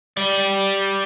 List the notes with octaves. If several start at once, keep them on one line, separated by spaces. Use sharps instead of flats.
G4 D5